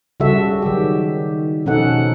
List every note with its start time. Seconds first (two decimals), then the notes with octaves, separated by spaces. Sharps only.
0.20 C#3 G3 F#4 A4 E5
0.62 D#3 F#3 G4
1.66 B2 F3 C#4 D#4 A4 F#5